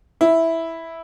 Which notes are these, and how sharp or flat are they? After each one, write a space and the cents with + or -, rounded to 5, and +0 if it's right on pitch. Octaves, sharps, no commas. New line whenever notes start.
E4 -5